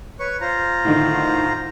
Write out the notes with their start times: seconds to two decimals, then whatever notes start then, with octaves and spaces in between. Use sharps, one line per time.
0.20 B4 C#5 C#6
0.41 F4 C5 A#5
0.85 A2 D3 D#3